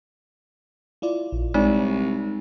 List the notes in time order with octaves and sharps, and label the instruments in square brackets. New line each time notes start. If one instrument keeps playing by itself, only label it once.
[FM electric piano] E4 F4 D5
A#1
[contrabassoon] C2 [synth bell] G#3 D#4 [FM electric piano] D5